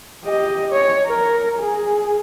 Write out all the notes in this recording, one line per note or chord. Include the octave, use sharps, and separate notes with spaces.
G4 D#5
C#5
A#4
G#4